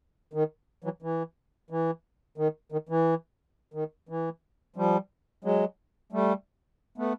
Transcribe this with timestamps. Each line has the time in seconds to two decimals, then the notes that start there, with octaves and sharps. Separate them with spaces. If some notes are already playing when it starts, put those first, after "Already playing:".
0.33 D#3
0.84 E3 F#3
1.02 E3
1.70 E3
2.38 D#3
2.72 D#3
2.89 E3
3.74 D#3
4.09 E3
4.76 F3 G3
5.44 F#3 G#3
6.12 G3 A3
6.98 A3 B3